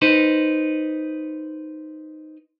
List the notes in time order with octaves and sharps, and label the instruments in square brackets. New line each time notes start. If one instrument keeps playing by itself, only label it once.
[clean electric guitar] D#4 B4 C5